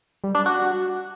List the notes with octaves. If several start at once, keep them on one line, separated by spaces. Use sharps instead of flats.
G3
D4
F#4